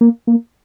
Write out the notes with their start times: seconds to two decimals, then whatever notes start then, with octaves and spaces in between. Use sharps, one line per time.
0.01 A#3
0.27 A#3